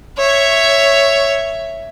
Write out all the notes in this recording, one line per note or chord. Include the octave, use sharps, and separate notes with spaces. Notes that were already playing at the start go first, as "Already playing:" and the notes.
C#5 E5